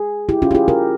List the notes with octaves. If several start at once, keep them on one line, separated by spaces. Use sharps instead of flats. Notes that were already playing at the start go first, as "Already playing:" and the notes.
Already playing: G#4
E4 G4
C#4 F4
G4
F4 G#4
G4 A#4